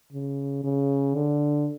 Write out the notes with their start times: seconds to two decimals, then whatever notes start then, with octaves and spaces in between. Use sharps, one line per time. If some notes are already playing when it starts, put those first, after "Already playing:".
0.13 C#3
0.64 C#3
1.15 D3